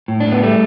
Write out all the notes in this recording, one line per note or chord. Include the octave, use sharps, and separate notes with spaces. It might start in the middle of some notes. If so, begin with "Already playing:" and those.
A2
D4
A2
B3
G3 A3